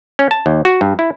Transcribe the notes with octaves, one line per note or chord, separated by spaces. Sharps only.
C#4
A5
D#2
F#4
G2
E4